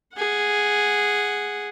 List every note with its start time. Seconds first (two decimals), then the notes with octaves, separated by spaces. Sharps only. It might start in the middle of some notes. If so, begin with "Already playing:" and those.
0.15 G#4 F#5